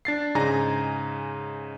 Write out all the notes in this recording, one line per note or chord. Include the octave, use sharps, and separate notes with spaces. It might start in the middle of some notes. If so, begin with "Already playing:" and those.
D4 A6 C7
G#2 C#3 D#4 G#5 A#5 A#6